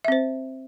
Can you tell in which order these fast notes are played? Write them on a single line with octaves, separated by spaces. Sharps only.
E5 C4 C5